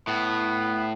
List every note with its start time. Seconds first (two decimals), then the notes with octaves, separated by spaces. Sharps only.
0.07 A2 B3